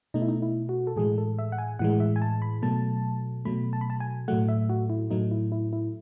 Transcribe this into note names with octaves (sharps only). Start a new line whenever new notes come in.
B2 A3 D#4
E4
D#4
E4
F#4
A4
A2 E3 G#3 G#4
A4
E5
F#5
G#5
A2 E3 G#3 F#5
E5
G#5
A5
B5
B2 F#3 A3 A5
B2 F#3 A3 B5
A5
B5
A5
G#5
A2 F#3 A3 F#5
E5
F#4
E4
A2 F#3 A3 D#4
E4
E4
E4